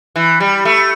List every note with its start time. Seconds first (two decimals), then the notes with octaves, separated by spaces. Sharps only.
0.16 E3
0.40 G3
0.65 A3